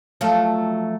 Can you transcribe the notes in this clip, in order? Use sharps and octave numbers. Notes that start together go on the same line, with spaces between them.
F3 F#3 A3